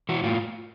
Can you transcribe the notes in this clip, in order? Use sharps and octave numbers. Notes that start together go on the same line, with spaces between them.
E3 F#4
A2 F4